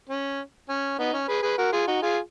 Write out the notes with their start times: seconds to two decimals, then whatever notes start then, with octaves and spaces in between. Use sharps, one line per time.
0.09 C#4
0.69 C#4
0.99 B3 D#4
1.13 C#4
1.28 G#4 B4
1.42 G#4 B4
1.58 F#4 A#4
1.72 F4 G#4
1.87 D#4 F#4
2.02 F4 G#4